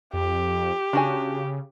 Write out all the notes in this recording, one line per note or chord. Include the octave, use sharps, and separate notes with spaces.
F2 G4
C#3 D4 F#4 G#5